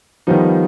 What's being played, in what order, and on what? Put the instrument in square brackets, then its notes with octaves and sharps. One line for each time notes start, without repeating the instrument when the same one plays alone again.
[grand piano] D#3 G3 B3 D#4 [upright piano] F3